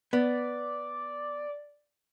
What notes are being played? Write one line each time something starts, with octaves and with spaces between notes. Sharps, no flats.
B3 D5